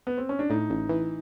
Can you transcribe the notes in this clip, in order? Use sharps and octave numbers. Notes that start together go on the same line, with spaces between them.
B3
C4
C#4
D4
A2 D#4
A1
E3